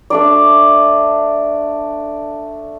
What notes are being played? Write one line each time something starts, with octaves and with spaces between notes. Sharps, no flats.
A3 D4 D5